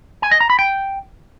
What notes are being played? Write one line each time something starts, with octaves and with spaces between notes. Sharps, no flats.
G#5
D#5
A#5
B5
G5